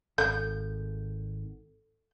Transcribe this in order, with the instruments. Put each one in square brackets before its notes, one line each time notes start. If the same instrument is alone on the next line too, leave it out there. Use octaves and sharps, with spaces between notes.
[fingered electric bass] G#1 [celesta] A4 [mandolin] G6